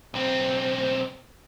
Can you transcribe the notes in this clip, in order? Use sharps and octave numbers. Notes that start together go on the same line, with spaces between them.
B1 C4